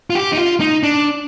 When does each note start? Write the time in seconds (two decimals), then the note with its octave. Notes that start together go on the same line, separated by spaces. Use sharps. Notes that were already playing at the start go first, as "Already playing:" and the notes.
0.10 F4
0.15 G4
0.33 D#4
0.38 F4
0.60 D#4
0.83 D4